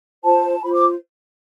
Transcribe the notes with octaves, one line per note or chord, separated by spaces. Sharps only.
F4 C5 A5
F4 C5 B5
D6